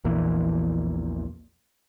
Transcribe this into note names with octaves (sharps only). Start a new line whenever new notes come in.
A#1 E2 A#2 E3